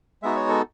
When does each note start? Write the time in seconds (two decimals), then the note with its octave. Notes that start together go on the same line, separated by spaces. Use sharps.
0.22 G#3 B3 D#4 F#4 E5
0.36 C#5
0.49 A4